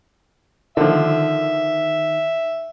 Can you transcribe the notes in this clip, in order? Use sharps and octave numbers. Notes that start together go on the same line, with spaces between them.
D3 D#3 F3 E5